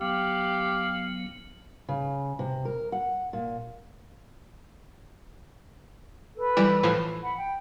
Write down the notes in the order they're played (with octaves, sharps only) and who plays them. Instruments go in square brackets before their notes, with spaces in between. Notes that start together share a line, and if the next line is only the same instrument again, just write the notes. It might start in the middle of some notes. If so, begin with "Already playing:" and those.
[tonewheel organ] F#3 B3 [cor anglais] G4 [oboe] F5
[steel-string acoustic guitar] C#3
C3
A#4
F#5
A#2
[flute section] A4 B4
[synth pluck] E3 G3
A2 E3 F3
[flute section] F#5 B5
G5